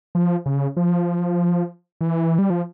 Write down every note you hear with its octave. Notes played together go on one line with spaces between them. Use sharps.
F3
C#3
F3
E3
G3
F3